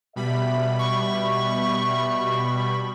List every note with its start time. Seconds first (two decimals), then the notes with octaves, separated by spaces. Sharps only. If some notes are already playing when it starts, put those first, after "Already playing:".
0.16 B2 G3 E5 B5
0.79 C#6